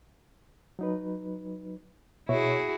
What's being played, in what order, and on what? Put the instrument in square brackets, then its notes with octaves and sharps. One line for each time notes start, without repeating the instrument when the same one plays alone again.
[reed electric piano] F#3 D#4 B4
[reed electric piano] B2 C#5 E5 [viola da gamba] E4 F#4 G#4